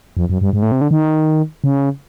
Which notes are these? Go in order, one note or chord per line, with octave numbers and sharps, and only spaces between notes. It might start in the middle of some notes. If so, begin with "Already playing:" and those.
F2
F#2
G2
G#2
A2
C3
D3
D#3
C#3